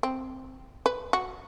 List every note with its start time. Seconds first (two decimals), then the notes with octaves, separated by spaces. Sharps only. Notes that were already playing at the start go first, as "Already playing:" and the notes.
0.03 C4
0.86 B4
1.13 F#4